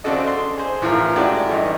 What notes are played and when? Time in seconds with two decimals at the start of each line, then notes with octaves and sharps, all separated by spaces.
0.04 C#3 C4 D4 F#4 A4 D#5
0.27 C6
0.57 G#4 C5
0.82 A1 A2 E3 F4 A#4
1.16 G#3 A3 D4 F#4 G4
1.49 G2 E3 D#4